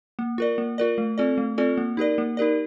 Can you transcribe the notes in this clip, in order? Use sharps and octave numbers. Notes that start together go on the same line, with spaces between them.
A#3
F4 A#4 D5
A#3
F4 A#4 D5
A3
C4 F4 A4 D5
A3
C4 F4 A4 D5
A#3
D#4 G4 A#4 D5
A#3
D#4 G4 A#4 D5